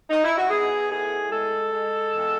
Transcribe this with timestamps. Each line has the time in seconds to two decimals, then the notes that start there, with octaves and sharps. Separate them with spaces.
0.10 D#4
0.24 E4
0.37 F#4
0.50 B3 G#4
0.90 A2 G#4
1.31 G#3 A4
1.72 G#3
2.12 E2